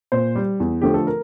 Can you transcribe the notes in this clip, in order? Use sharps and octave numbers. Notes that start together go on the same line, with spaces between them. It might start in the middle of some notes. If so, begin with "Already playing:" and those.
A#2 C5
G3
E2
D3 F3 A3 G4
A4
A#4